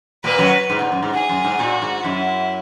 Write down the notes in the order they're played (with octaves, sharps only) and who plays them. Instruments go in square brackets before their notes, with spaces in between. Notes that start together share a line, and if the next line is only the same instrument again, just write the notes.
[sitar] A#2 A#3 [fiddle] B4
[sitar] F#2 F#3
G#2
A#2
F#2
G#2
[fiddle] G#4
[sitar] F#2
G#2
[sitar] A#2 [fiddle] F#4
[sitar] G#2
[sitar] F#2 [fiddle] E4